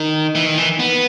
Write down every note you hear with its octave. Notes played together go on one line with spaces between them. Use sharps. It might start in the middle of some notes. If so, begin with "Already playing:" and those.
Already playing: D#3
E3
D#3
E3
B3